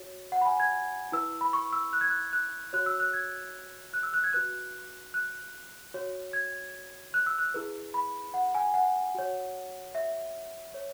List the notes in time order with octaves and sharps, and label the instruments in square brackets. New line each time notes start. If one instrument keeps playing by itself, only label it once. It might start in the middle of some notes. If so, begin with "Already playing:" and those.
Already playing: [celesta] F#4 C#5
F#5
B5
G#5
G#6
E4 B4 E6
B5
C#6
E6
F#6
G#6
F#6
F#6
F#4 C#5 F#6
E6
F#6
G#6
F#6
E6
F#6
G#6
F#4 B4 F#6
F#6
F#4 C#5
G#6
F#6
E6
F#6
E4 G#4 B4
B5
F#5
G#5
F#5
F#4 C#5
E5
C#5